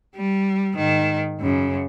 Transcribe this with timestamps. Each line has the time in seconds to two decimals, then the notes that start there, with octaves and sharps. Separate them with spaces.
0.16 G3
0.75 G#2 D#3
1.39 F#2 C#3